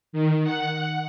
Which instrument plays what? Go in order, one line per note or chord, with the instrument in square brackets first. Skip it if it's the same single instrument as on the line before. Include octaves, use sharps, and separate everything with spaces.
[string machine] D#3
F#5